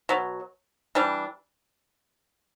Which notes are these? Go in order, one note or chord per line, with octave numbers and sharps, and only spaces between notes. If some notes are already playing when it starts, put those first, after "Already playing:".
B2 F#3
E3 G3 D4